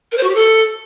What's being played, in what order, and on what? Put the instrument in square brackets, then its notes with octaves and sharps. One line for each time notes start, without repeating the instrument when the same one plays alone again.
[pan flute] A#4
C5
F#4
G4
A4